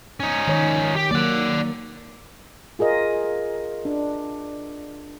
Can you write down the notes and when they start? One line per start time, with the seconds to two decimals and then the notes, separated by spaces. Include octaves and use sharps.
0.20 C#4 D#4
0.47 D#3 C#5
0.96 G4
1.11 D#3 F#3 A#3 D5 F#5
2.79 F4 G#4 A#4 D#5
3.85 D4